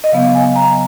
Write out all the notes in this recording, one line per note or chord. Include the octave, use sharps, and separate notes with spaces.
D#5
C#3 F#3 B3 F5
G#5
A#5